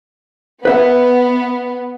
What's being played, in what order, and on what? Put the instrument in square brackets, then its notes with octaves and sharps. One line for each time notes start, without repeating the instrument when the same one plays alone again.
[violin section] B3 [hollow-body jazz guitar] B4 E5 F#5